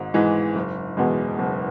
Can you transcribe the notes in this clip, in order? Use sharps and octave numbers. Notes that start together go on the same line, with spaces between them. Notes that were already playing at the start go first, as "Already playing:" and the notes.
Already playing: G#1 G#2
G#2 E3 G#3
F#1
E2 B2 G#3
F#1